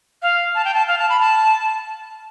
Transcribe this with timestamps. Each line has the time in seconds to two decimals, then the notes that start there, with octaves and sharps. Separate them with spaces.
0.22 F5
0.55 A5
0.65 G5
0.74 A5
0.88 F5
0.99 A5
1.09 B5
1.20 A5